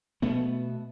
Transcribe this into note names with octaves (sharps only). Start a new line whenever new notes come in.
B2 A3 B3